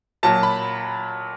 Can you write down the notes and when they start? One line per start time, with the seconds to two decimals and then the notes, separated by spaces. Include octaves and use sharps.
0.23 A#2 F#3 A5
0.43 B5